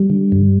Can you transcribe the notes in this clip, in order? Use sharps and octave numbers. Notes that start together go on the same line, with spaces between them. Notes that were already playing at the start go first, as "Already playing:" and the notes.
Already playing: G3
D3
G2